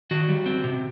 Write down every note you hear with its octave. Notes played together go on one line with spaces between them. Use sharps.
D#3 F#4
G3
C4
C3